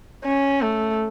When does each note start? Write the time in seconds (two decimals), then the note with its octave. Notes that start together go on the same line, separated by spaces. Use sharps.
0.24 C#4
0.61 A3